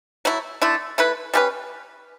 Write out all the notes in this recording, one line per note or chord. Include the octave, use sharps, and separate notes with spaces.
F#3 A3 E4
D3 A3 E4
A3 E4 B4
G3 C#4 G4 B4